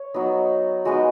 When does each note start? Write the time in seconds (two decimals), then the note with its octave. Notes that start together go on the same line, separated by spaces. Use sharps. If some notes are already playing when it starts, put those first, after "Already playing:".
Already playing: C#5
0.14 F#3 B3 D#4
0.85 G#3 B3 D#4 F#4